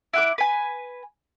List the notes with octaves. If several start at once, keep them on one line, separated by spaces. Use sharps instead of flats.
E4 F#5 D6
B4 G#5